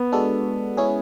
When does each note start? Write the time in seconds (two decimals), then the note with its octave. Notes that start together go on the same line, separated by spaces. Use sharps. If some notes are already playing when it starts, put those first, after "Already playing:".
Already playing: B3
0.12 G#3 D4 F#4 A4
0.77 G#3 C#4 E4 G#4